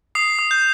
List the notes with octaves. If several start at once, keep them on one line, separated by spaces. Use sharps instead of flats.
D#6 C7
D#6
G6